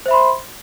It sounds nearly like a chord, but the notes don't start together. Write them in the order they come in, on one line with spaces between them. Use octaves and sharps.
C5 E5 B5 C6